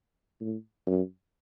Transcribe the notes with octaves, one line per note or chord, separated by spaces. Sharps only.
A2
F#2